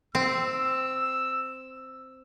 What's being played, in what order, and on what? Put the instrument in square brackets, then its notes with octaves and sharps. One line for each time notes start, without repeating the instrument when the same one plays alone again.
[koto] C4 [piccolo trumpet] E6